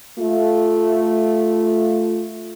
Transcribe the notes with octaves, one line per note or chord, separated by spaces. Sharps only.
A3 F4